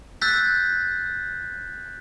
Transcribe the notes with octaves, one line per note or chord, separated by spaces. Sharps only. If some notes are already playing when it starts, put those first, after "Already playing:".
E6 F#6 G6 A6 B6